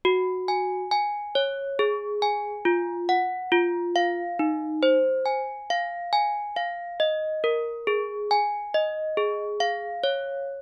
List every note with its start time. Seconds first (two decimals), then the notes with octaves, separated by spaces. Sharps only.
0.05 F#4
0.48 G#5
0.91 G#5
1.35 C#5
1.79 G#4
2.22 G#5
2.65 F4
3.09 F#5
3.52 F4
3.96 F5
4.39 D#4
4.83 C5
5.26 G#5
5.70 F5
6.13 G#5
6.56 F5
7.00 D#5
7.44 A#4
7.87 G#4
8.31 G#5
8.74 D#5
9.17 G#4
9.60 F5
10.04 C#5